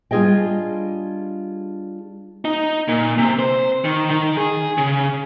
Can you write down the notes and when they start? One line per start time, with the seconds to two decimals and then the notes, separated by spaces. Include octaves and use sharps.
0.11 G3 D4 F4 G#4 D#5 G5
2.45 D#4
2.88 A#2
3.18 C3
3.39 C5
3.85 D#3
4.11 D#3
4.37 G#4
4.78 C#3